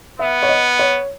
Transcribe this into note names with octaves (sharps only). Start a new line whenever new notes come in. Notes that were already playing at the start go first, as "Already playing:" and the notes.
B3 E5
C#5
D#5
C#5